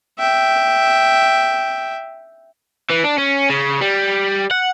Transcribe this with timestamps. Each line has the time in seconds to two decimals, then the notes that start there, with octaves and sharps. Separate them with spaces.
0.19 E5 G5
2.90 E3
3.04 D4
3.18 C#4
3.50 C#3
3.81 G3
4.51 F#5